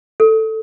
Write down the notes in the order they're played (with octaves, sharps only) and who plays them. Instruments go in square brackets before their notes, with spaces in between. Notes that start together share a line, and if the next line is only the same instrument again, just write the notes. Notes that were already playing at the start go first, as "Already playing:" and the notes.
[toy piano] A4